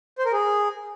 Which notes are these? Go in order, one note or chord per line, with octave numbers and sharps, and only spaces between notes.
C5
A#4
G#4